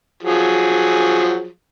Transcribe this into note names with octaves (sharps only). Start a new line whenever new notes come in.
F3 F#3 G#4